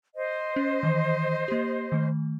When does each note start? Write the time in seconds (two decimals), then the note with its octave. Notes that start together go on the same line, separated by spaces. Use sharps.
0.15 C5 D#5
0.56 C#4
0.83 D#3 E3
1.48 A#3 G4
1.92 D#3 A3